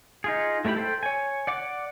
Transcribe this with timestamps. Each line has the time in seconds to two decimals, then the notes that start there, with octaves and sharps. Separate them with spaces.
0.24 D#4 F4 G#4
0.65 A3 B3 E4 G4 B5
0.76 A4 C5 G5
1.03 C#5 G#5
1.47 D5 F#5 D6